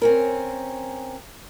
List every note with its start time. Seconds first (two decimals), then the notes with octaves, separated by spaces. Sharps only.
0.02 C4 C#4 A#4